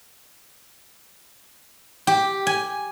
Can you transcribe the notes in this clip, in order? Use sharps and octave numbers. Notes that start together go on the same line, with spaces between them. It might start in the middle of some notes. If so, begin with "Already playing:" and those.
G4
G#5